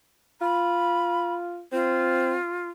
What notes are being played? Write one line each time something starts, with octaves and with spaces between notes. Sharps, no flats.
F4 B5
C4 F4